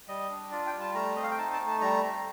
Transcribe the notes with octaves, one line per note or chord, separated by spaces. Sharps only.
G3 D#5
D4
F4 D5
G5
G3
A5
A3 A#5
C4 D#5
F5
G5
D#4 A5
A5
A3
A5
G3 A#5
C4